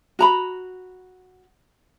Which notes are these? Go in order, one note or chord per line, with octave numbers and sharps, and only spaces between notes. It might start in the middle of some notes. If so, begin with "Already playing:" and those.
F#4 A#5 B5